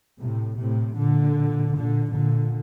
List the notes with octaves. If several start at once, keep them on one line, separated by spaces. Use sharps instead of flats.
A2 C3
A2 C3
A#2 D3
A#2 D3
A#2 D3